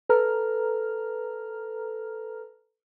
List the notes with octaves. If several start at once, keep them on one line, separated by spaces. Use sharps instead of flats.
A4 B4 A#5 F6